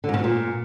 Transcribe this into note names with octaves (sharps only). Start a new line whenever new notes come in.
D3
G#2
C#3
B2
A#2